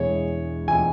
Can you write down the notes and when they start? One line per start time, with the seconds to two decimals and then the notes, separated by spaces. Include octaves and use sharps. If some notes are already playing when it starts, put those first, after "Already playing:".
Already playing: E1 E2 E3 G#3 C#5
0.68 E1 E3 G#3 G#5